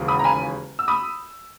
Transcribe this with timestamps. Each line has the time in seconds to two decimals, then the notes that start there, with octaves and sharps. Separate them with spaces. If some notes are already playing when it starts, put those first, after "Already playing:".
Already playing: E1 D#2 C#3 F#3 A#3
0.08 B5 D#6
0.19 A#5
0.24 G#5 B5
0.79 E6
0.88 B5 D#6